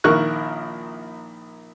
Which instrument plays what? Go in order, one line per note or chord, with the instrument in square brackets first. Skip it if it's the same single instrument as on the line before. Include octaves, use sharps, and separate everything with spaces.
[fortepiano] A#1 D#3 E4 A#4 C#6 F#6